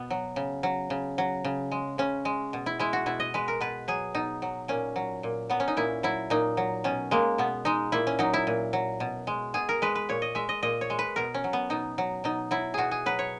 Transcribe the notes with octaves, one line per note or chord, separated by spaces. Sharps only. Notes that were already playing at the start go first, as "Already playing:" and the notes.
Already playing: B2 B3
F#3
C#3
F#3
C#3
F#3
C#3
G#3
C#3 C#4
G#3
B2
E4
G#3 E4
F#4
B2 E4
D#5
G#3 B4
A#4
B2 B4
F#3 G#4
B2 D#4
F#3
A#2 C#4
F#3
A#2
F#3 B3
C#4
D#4
A#2 E4
F#3 E4
A#2 D#4
F#3
B2 C#4
G#3 A#3
B2 B3
G#3 D#4
A#2 E4
C#4
F#3 D#4
E4
A#2
F#3
B2
G#3
B2 G#4
A#4
G#3 B4
B4
A#2 C#5
D#5
G#3 E5
D#5
A#2 D#5
C#5
G#3
B4
B2 A#4
C#4
F#3
B3
B2 D#4
F#3
B2 D#4
F#3 E4
B2 F#4 G#4
G#4
F#3 B4
C#5